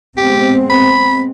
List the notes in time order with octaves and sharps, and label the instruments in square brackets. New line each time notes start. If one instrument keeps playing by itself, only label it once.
[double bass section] G#3 B3 C4 [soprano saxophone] G4
[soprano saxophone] B5